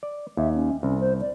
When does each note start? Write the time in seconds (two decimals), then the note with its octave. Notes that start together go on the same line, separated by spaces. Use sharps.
0.03 D5
0.37 D#2 E5
0.54 C#4
0.83 C2 C#4
1.00 C5
1.21 D5